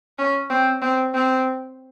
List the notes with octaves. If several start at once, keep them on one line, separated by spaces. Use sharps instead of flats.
C#4
C4
C4
C4